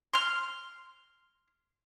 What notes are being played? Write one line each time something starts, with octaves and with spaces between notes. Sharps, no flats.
C6 F6